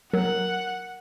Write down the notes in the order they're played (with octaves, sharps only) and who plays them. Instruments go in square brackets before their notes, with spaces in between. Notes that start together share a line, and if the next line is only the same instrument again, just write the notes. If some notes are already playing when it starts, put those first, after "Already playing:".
[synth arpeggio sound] F#3 [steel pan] A#4 [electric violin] F#5